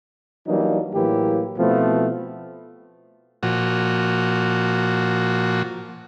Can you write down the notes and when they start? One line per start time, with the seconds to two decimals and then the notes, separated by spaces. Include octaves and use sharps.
0.47 E3 F#3 G3 A#3 D4 D#4
0.94 A2 E3 F#3 A#3 E4 G4
1.58 B2 F3 A3 B3 C4 E4
3.43 A#2 F3 F#4